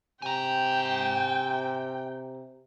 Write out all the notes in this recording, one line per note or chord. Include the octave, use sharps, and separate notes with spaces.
C3 G5 G#5 A#5